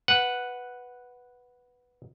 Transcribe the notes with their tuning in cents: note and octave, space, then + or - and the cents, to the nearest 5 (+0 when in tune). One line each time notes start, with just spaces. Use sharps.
B4 +0 F#5 +0